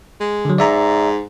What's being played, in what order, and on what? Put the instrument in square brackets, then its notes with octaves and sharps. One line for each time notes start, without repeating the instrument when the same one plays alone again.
[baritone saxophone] G#3
[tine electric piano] D3 F#3
[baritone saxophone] G#2 [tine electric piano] D5 E5 A#5